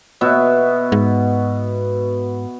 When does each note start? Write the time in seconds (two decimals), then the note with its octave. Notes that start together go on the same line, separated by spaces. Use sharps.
0.21 B2 B3 E5
0.92 G#2